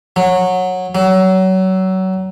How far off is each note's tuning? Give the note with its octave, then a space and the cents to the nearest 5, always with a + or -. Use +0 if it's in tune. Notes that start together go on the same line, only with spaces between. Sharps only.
F#3 -15
F#3 +25